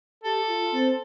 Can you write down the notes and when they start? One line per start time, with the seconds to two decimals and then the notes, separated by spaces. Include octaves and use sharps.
0.24 G4 A4
0.48 F4
0.72 C4